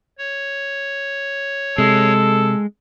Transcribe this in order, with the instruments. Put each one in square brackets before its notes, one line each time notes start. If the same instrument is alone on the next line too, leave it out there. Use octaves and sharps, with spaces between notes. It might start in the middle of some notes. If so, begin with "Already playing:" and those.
[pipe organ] C#5
[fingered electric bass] C3 [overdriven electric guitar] G#3 [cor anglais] A4